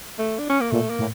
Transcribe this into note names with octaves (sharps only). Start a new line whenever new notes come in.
A3
D4
C#4
A#3
A#2 A3
A#3
A2